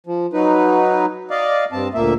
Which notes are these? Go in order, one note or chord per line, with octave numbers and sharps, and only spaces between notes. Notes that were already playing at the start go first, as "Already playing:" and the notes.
F3
F#3 D#4 B4
D5 D#5 F5
G2 C4 A5
D2 A#2 A#3 E5